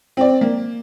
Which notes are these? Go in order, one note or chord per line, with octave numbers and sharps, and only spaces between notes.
C4 D5
A#3